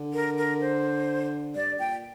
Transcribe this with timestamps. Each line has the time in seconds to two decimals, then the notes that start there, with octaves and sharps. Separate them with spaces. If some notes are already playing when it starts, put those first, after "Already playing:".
Already playing: D3
0.13 A#4
0.37 A#4
0.61 C5
1.55 G2 D5
1.79 A#2 G5